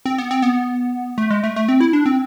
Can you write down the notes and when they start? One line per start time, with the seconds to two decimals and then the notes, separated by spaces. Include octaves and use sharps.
0.06 C4
0.18 B3
0.31 C4
0.42 B3
1.18 A3
1.30 G#3
1.44 A3
1.56 A3
1.69 C4
1.81 E4
1.93 D4
2.06 C4